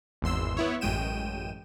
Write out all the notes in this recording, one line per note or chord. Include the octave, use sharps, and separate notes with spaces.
G#1 E2 C6 E6
B3 E4 C#5
A1 F#2 G#3 G5 D#7 E7